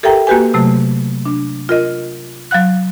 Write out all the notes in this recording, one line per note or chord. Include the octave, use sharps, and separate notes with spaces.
G4 A4 A#4 E5 G5 A#5
A#3 F#4 G4 B4 G#5
C3 F#3 A3
D4
F4 A#4 D#5
F#3 F5 F#5 F#6